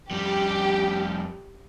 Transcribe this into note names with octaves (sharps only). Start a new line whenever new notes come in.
F2 G3 G4